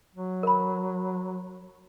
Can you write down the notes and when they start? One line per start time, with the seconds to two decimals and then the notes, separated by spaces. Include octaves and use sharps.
0.15 F#3
0.43 A#4 B5